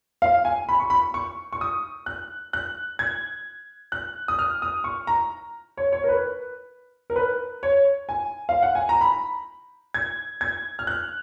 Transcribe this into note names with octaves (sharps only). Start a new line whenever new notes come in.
F5
G#5
B5
C#6
B5
C#6
C#6
D#6
F#6
F#6
G#6
F#6
D#6
F6
D#6
C#6
A#5
C#5
C#5
A#4
B4
A#4
B4
C#5
G#5
F5
F#5
G#5
A#5
B5
G#6
G#6
F6
F#6